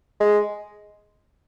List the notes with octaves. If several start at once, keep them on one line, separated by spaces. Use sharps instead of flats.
G#3